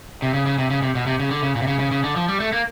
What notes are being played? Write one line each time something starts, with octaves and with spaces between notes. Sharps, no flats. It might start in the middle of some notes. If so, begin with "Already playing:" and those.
C3
C#3
C#3
C3
C#3
C3
B2
C3
C#3
D3
C#3
A#2
C3
C#3
C#3
C#3
D3
F3
G3
A3
A#3